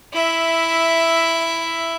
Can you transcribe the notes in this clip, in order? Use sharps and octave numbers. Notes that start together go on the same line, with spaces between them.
E4 E5